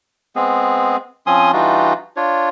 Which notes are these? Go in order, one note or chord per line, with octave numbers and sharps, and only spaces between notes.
G#3 B3 C4 G#4
F3 C4 C#4 G#5 C6 D#6
E3 G3 D4 D#4 F4 F#4
D4 F4 C#5